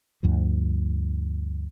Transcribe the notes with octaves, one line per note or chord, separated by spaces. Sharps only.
D2 G2 F3